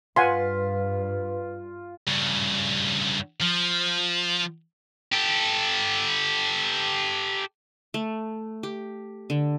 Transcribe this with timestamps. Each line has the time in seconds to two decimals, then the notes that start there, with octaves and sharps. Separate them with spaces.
0.16 G2 F4 B4 F#5 G#5 C6
2.07 G2 C#3
3.42 F3
5.12 G4 A4
7.94 A3
8.63 G4
9.30 D3